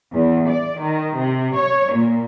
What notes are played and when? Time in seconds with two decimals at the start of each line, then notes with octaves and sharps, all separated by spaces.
0.14 E2
0.49 D5
0.82 D#3
1.17 C3
1.57 C#5
1.94 A#2